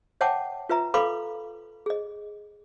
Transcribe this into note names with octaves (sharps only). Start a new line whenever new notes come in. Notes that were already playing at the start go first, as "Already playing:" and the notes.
C#5 E5 F#5 G5 A5 D6
F4 B4 E5 A#5
A4 B4 F5 B5 C6 D6
G#4 D#5